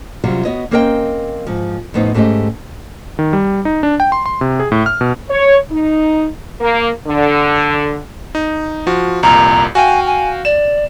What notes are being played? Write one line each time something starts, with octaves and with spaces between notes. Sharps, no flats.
F#2 C3 F#3 G3 F4
B3 F#4 C#5 D#5
A#3 C4 C#4 A#4 D#5 G5
G#2 F3
F2 A2 B3 C4 D#4
G#2 A3 B3 C#4 G4 D#5
D#3
G3
D#4
D4
G5
C6
C6
C3
G#4
A2
F6
B2
C#5
D#4
A#3
D3
D#4
F3 F#4
C2 F2 A#2 A#5
F#4 F5 G5 G#5
G#5
D5 E7